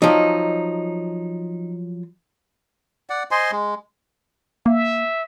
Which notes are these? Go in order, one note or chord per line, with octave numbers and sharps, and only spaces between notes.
F3 F#3 D#4
D5 F#5
C5 D#5 G#5 C6
G#3
A#3 E5